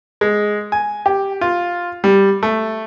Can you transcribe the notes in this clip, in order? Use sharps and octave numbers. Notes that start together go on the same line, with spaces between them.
G#3
G#5
G4
F4
G3
A3